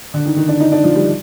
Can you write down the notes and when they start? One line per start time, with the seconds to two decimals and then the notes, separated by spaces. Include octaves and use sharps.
0.14 D3
0.25 D#3
0.36 D#3
0.48 D4
0.60 D#4
0.72 D4
0.84 F3
0.96 G3